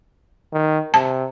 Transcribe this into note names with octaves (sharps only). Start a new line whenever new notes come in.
D#3
C3 A5